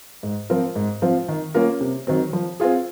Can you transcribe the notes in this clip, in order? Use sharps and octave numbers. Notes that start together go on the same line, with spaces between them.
G#2
F3 C4 F4 A#4
G#2
F3 C4 F4
D#3
A#3 C#4 F4 A#4
C3
D#3 F#3 C4
F3
C4 F4 G#4